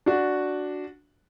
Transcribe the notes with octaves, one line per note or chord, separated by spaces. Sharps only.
D4 F#4